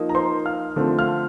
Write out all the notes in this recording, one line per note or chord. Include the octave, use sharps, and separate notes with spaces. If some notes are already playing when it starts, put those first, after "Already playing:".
Already playing: F3 A#3 D#4
A#5
C5 C6
F5 F6
D3 F3 A3 C4
F5 F6